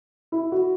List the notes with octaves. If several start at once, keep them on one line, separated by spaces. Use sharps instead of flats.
E4
F#4